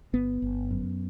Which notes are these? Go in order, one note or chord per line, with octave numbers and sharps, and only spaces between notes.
G1 B3
G1
F#2